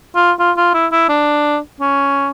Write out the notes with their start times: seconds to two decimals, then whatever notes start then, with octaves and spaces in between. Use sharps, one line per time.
0.15 F4
0.40 F4
0.57 F4
0.74 E4
0.92 E4
1.09 D4
1.81 C#4